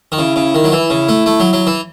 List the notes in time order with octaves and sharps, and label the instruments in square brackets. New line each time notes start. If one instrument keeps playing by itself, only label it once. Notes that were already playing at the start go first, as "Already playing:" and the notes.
[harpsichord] D#3
[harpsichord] C#3 [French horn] E4
[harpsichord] C#3
D#3
F#3
[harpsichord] E3 [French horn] E4
[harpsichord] C#3
A3
A3
F#3
F#3
E3